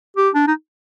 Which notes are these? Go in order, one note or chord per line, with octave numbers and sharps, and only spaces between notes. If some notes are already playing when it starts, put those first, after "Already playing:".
G4
D4
D#4